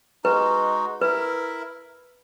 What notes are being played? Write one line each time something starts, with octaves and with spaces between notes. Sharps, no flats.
G#3 D#4 F#4 B4
E4 A#4 B4 E5